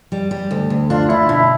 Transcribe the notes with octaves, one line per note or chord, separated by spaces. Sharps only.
G3
G3
D2
D2
D4 F4
D4 E4
B2 E4